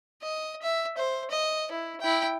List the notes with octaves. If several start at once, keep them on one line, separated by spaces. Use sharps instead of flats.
D#5
E5
C5
D#5
E4
E4 G5